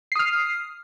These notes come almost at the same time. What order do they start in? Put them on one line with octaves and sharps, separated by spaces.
C7 D#6 F6